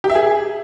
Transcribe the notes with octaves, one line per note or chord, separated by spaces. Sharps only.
G4
E5
G#4